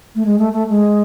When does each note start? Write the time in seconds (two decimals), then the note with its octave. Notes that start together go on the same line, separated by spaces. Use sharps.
0.15 A3
0.26 G#3
0.39 A3
0.53 A3
0.69 G#3